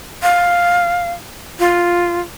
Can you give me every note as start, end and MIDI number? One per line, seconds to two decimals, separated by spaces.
0.23 1.12 77
1.59 2.20 65